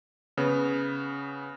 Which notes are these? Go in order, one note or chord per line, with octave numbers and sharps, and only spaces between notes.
C#3 B3